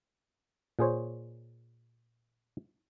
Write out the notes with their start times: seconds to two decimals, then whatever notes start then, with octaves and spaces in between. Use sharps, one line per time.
0.79 A#2 G#4 C5 C#5